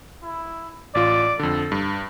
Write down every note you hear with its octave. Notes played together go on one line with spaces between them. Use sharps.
E4
A1 F4 D5
F2 D3 A4
G2